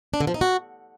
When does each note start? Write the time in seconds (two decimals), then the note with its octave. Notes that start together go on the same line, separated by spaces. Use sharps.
0.14 D4
0.20 D3
0.27 F3
0.34 D#4
0.41 F#4